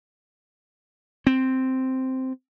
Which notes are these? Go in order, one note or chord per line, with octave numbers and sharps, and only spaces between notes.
C4